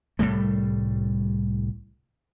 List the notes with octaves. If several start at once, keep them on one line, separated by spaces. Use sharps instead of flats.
C2 A2 G3 A3